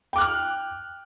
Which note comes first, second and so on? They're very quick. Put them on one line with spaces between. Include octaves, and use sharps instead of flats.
G5 D6 F#6 F6